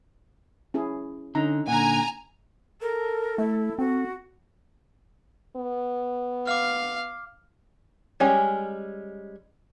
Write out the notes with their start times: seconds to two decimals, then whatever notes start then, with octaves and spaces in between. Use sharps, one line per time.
0.74 C#4 E4 G#4
1.35 D3 C#4 D#4 A#5
1.67 A#2 D3 F#5 G#5 A#5
2.82 A4 A#4
3.38 A3 E4
3.79 C4 F#4
5.56 B3
6.47 F5 D6 F6
8.20 G3 G#3 C#4 G#5